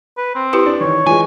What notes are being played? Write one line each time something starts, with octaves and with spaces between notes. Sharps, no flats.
B4
C4
E4 G4 B4
D4
D#3 E3 C#5
E3 G#3 F4 G#5